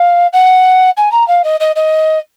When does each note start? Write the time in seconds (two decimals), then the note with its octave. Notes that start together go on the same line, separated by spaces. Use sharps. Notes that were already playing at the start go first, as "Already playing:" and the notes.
Already playing: F5
0.33 F#5
0.97 G#5
1.12 A#5
1.28 F5
1.44 D#5
1.60 D#5
1.76 D#5